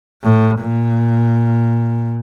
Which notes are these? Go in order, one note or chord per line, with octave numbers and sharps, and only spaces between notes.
A2
A#2